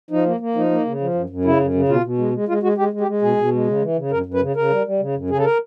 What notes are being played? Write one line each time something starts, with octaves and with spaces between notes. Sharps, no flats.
F3 D#4
A#3
A#3
F3 D#4
A#3
C#3
F3
F#2
F#2
C#3 E4
F#2
C#3
B2 F4
B2
G#3
G#3
G#3 F4
G#3 F#4
G#3 G4
G#3
G4
G#3
B2 G#4
B2
G#3
C#3
E3
C#3
F#2 A#4
F#2
B4
C#3
C#3 A#4
G3
G3
C#3
F#2
C#3 G#4
A4
A#4